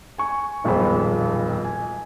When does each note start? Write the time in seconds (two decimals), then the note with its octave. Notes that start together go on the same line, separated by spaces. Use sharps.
0.18 G#5 C#6
0.64 D#1 B1 F2 G#3 C5 B5
1.64 G#5